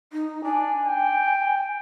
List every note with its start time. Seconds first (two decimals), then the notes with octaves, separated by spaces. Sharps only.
0.13 D#4
0.44 D4 G#5
0.87 G5